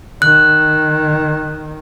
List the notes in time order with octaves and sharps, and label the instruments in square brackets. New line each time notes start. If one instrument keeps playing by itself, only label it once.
[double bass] D#3 [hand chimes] F#6